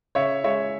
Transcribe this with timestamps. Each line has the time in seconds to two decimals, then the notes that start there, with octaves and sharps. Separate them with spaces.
0.15 C#3 C#5 E5
0.44 G#3 C#5 E5